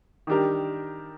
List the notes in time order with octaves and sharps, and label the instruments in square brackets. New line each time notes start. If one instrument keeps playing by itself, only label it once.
[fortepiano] D#3 G3 D4 G4 A#4